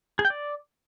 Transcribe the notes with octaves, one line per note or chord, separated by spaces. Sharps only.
G#4
G5
D5